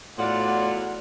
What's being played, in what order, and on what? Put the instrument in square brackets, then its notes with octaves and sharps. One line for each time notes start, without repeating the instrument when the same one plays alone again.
[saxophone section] E2 F#3 F#5 [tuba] A2 [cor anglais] F4 [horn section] D5